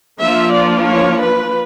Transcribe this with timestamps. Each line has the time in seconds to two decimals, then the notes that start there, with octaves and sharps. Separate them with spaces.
0.20 F3 A#3 D4 F4 E5
0.53 D5
0.86 C#5
1.20 B4